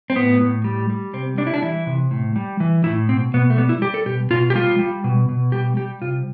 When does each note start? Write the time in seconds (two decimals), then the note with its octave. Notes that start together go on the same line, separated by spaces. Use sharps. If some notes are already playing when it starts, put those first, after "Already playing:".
0.10 C4
0.15 A2 B3
0.41 A2
0.64 G3
0.90 G3
1.13 C3 C4
1.38 G3 D4
1.47 E4
1.54 D4
1.62 E3 E4
1.87 C3
2.11 A2
2.36 G3
2.60 E3
2.84 A2 E4
3.09 B2 C4
3.34 B2 B3
3.50 A3
3.57 G3 B3
3.69 E4
3.82 G3 G4
3.94 A4
4.06 B2 G4
4.31 B2 F4
4.50 G4
4.55 G3 F4
4.79 G3
5.04 B2
5.29 B2
5.52 G3 G4
5.77 G3 G4
6.02 C3 F4